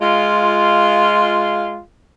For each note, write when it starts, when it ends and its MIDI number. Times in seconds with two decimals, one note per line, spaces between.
0.02 1.82 56
0.02 1.82 65